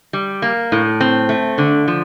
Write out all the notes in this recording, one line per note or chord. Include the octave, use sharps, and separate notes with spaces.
G3
A#3
A2
C4
A3
D3
F3